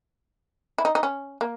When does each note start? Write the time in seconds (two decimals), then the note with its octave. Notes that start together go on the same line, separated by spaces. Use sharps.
0.78 E4
0.85 D#4
0.95 D#4
1.03 C#4
1.41 A#3